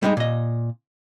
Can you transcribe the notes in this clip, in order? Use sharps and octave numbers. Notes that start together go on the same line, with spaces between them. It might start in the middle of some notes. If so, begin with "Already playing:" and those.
G3 G#3 B3 D#4 G#4
A#2 D#5